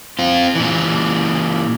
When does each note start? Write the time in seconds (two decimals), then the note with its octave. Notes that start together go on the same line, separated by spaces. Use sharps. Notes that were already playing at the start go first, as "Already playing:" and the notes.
0.19 C4 F4
0.55 A#2 E3